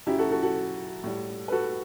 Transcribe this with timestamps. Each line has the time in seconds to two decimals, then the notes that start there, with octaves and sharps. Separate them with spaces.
0.06 F#2 C#3 F#3 E4 G4
0.18 F#4 A4
0.31 F#4 A4
0.43 F#4 A4
1.04 A2 G3
1.48 B4
1.52 F#4 A4